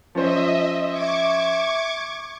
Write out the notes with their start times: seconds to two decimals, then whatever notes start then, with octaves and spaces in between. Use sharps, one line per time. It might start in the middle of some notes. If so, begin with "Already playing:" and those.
0.15 F3 C#4 C5 D#5 E5
0.92 E5 C#6 D6 G#6